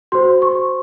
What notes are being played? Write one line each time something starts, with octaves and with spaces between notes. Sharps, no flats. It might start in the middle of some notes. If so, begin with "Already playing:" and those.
F#4 C5 C6
C#6